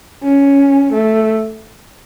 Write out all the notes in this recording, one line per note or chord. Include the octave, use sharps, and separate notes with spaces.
C#4
A3